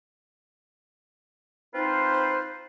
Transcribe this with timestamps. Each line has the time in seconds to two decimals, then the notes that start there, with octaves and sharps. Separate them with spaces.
1.74 C4 D#4 F4 B4 C5